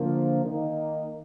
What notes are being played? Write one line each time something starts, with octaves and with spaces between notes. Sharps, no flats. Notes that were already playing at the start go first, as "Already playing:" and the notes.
Already playing: D3 F3 A#3
D#3 A#3 D#4